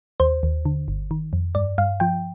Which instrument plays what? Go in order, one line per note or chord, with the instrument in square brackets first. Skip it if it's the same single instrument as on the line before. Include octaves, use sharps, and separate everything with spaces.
[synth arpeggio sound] D#2 C5
D#2
D3
G1
D#3
F2
G2 D5
G2 F5
F3 G5